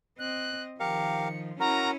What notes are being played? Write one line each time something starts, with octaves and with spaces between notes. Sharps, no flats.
C4 D#5 F#6
D#3 F3 G4 A#4 F5 C#7
C#4 E4 F#4 A#4 A#5